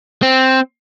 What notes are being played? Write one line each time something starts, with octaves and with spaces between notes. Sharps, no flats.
C4